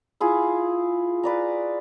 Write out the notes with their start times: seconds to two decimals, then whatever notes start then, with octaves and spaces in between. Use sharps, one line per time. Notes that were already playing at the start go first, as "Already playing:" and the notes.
0.20 E4 F4 G#4
1.23 F4 B4 D5 A#5